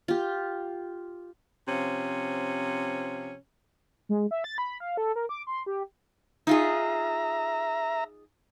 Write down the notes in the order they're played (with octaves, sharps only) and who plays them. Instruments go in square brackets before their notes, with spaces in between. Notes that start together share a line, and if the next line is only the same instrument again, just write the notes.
[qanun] F4 G4
[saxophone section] C3 F3 C#4
[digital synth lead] G#3
E5
A6
B5
F5
A4
A#4
D6
C6
G4
[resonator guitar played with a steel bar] D#4 F4 G#4 [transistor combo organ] E5 A#5